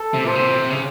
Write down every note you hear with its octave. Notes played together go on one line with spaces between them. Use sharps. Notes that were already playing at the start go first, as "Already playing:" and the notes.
Already playing: A4
C3
A#2 C5
C3
C#3